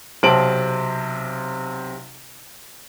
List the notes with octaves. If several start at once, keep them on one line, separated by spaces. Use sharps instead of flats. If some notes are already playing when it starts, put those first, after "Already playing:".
B1 C3 C4 A5 D7 F#7